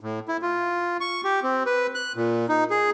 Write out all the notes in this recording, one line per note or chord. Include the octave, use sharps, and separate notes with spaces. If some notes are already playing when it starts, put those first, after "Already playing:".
A2
E4
F4
C#6
G4
C4
B4
F#6
A#2
D#4
G#4